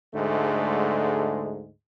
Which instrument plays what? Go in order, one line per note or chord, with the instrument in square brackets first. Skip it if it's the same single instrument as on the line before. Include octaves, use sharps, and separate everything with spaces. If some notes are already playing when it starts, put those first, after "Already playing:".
[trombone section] D2 G#2 D3 G#3 A3